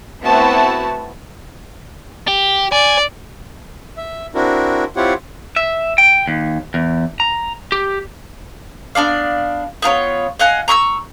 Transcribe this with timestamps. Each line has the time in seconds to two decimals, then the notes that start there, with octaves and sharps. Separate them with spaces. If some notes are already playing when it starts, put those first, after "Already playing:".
0.23 A3 B3 C4 E4 F#4 A5
2.28 G4
2.72 D5 G#5
3.97 E5
4.35 C4 D4 E4 F#4 A#4
4.96 C4 E4 F4 G4 C#5 F#5
5.56 E5
5.98 G5
6.27 D#2
6.74 E2
7.20 A#5
7.72 G4
8.95 B3 D4 D5 F5
9.82 B3 F4 A#4 C#5
10.39 D#5 F5 F#5 G#5
10.68 A#5 C#6 D#6 E6